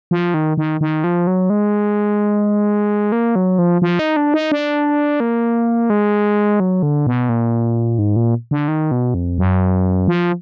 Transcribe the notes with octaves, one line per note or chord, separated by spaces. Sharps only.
F3
D#3
D#3
D#3
F3
F#3
G#3
A#3
F#3
F3
F3
D#4
D4
D#4
D4
A#3
G#3
F#3
D3
B2
A#2
G#2
A#2
D3
D#3
B2
F2
F#2
F3